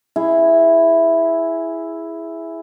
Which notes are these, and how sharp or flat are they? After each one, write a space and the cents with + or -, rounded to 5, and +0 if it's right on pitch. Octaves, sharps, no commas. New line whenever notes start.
E4 +0 G#4 +0